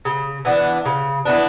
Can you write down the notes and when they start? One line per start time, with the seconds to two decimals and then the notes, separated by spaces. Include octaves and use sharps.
0.05 C#3
0.45 E3 B3 D4
0.86 C#3
1.25 E3 B3 D4